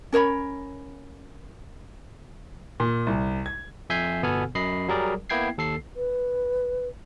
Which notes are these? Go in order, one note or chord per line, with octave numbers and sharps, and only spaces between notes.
C#4 A#4 C#5 B5
A#2
C2
G#6
F2 E5 G#5 G6 C7
G1 B2 B3 A4 G#5 F6
F#2 D#5 B5 C7
F#3 G3 G#4 A#4 D5
A#3 B3 E4 G5 G#6 C7
D#2 A4 C7
B4